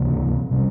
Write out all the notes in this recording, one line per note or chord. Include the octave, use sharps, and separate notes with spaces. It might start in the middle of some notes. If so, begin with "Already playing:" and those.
Already playing: C#2 C3 E3 A#3
C3 G3 C#4